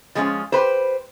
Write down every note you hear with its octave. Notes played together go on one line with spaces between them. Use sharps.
F3 G#3 C#4 D#4 F4
G4 B4 C5